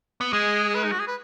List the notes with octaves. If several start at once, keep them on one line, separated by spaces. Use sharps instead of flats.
B3
G#3 G#4
G#4
B4
D#4
F#4
G#4
B4